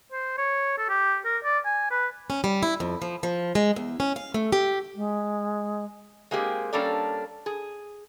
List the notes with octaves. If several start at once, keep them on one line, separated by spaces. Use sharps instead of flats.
C5
C#5
A4
G4
A#4
D5
G#5
B4
C#4
G3
E4
F2
F3
F3
G#3
E2
C#4
F5
A3
G4
G#3
G#3 A#3 C4 G4 G#4
G3 A#3 C#4 D4 A4 D5
G#4